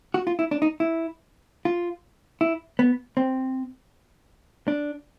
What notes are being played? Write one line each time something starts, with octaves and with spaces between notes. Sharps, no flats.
F#4
F4
E4
D4
D#4
E4
F4
E4
B3
C4
D4